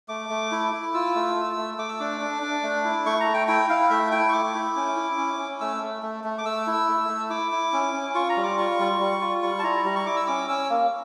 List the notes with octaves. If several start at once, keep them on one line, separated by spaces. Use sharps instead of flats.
A3 D6
A3
E4
E4
F4 E6
A3
A3
A3
A3 D6
E6
D4 D6
D4
D4
A3
E4
A3 C#6
A#5
A3
G5
E4 G5
E4 F5
A3 E5
E4 G5
C#6
A3 D6
E4
C#4
E4
C#4
C#4
A3 E6
A3
A3
A3
D6
A3 E6
E4
A3
A3
E4 D6
E4
C#4
C#4
F4 C#6
A#5
G3
D6
F4 C#6
G3
G3
F4
G3 C#6
A5
E4 A#5
G3 A#5
C#6
E4 D6
E6
C#4 D6
C#4 E6
A#3